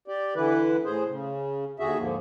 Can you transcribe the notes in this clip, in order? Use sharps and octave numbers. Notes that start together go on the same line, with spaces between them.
G4 D5
D3 E3 E4 B4
A2 G#4 C5
C#3
D#2 D3 F#4 G#4 E5
G#2 D3 F3 A#3